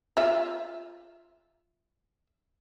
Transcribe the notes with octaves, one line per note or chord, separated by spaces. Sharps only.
F4 E5